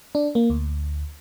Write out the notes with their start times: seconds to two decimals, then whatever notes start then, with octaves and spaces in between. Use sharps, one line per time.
0.15 D4
0.35 A#3
0.50 D2